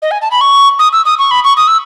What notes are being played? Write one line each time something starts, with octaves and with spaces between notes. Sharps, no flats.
D#5
G#5
A5
B5
C#6
D#6
E6
D#6
C#6
B5
C#6
D#6
E6